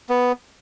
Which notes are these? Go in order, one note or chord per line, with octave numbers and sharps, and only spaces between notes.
B3